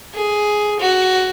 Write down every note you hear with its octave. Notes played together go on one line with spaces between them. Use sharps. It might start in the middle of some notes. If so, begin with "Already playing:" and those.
G#4
F#4